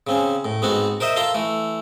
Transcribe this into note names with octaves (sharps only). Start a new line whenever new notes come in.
C#3 C4 C#4
A2
G#2 B3 C4 F#4
A#4 C5 D#5 E5
F4 A4 A#5 C6
E3 A3